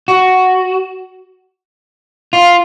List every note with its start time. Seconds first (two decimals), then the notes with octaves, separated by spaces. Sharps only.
0.08 F#4
2.33 F4